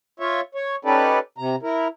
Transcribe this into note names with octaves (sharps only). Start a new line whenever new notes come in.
F4 C#5 E5
C#5
C#4 D#4 G4 A4 B4 D5
C3 A#5
E4 A#4